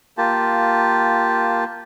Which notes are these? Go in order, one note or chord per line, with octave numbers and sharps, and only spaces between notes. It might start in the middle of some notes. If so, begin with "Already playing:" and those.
A#3 F4 G4 A5